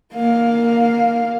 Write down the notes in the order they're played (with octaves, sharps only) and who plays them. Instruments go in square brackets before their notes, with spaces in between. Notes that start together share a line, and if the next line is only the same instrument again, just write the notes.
[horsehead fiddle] A#3 F5